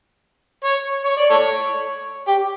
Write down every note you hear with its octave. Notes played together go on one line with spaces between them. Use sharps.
C#5
C#5
D5
A4 C#5
G4